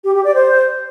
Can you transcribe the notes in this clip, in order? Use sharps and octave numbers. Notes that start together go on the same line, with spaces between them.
G4
G4
D5
C5